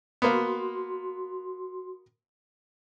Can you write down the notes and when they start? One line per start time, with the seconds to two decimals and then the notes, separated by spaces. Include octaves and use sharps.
0.22 A#3 B3 F#4 C6